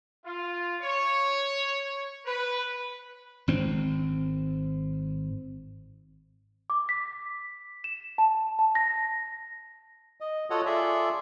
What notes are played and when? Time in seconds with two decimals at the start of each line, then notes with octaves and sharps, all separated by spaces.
0.24 F4
0.82 C#5
2.25 B4
3.48 G#1 C4
6.70 D6
6.89 B6
7.84 E7
8.18 A5
8.59 A5
8.75 A#6
10.20 D#5
10.50 F4 F#4 A4 C#5 D#5 F#5
10.66 F4 G#4 A4 D5 E5